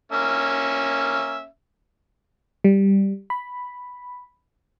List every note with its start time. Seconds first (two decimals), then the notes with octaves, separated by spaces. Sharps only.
0.12 A#3 C#4 E5
2.64 G3
3.30 B5